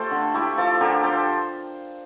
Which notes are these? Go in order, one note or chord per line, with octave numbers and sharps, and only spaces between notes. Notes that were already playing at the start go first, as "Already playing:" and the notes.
Already playing: A3 F4 G4 A4 C5
D3
A3 E4 G4
F3 F4 A4
D3 G4 A#4
F3 A4 C5